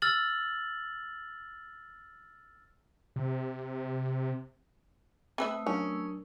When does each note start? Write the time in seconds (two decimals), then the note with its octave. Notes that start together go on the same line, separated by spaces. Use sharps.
0.02 E6 F6 A6 F#7
3.16 C3
5.38 A3 C4 B4 E5 D#6 E6
5.67 F#3 C#4 D4 A#4